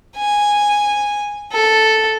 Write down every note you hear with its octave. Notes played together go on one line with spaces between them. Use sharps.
G#5
A4